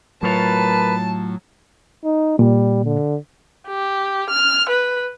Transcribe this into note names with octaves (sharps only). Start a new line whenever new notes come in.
A2 F#3 F4 A#4 B4 C#5 A5
D#4
A#2 G3
D3
G4
F6
B4